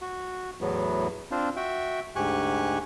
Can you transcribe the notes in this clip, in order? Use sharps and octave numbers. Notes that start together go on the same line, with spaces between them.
F#4
E2 A2 F#3 B3
C4 D4 F4 C5
F#4 E5 G5
D2 G#2 G4 G#5 C#6 F#6